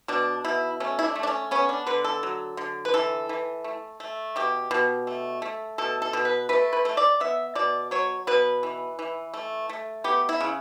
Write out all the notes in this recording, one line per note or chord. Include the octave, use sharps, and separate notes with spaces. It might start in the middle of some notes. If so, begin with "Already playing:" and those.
B2 D4
B2 E4
A3 C#4
E4
D4
A3
D4
C#4
B3 C#4
D4
D3 B4
A4
F#3
D3
B4
E3 A4
E3
A3
A3
B2 G4
B2
A3
A3
B2 A4
A4
B2
B4
A3 B4
B4
A3
D5
B3 E5
B2 D5
F#3 C#5
B2 B4
E3
E3
A3
A3
B3 G4
E4
C#3